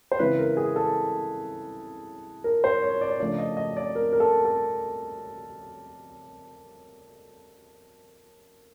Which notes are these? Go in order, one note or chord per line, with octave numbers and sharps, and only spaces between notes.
C5
C#3 E3 G#3 C4 E4 B4
A#4
G#4
A4
A#4
C5
C#5
D5
C#3 F3 A3 D4 D5
D#5
D#5
D5
A#4
A#4
A4
A4